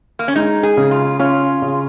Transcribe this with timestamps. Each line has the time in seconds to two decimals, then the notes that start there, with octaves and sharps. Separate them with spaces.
0.19 A#3
0.28 C#4
0.35 G#3 D#4
0.63 G#4
0.77 C#3
0.91 F4
1.19 C#4 F4
1.62 C#3